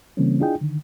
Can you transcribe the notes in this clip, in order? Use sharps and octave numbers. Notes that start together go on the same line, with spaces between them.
C#3 E3 G3 A#3 C4 C#4
D4 E4 F4 G#4 D#5 G5
D3 D#3